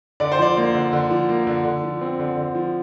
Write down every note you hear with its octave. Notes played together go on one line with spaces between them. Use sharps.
D3 D5
C5
F3 D5
A#3
D3
D3
F3
A#3
D3
D3
F3
C4
D3
D3
F3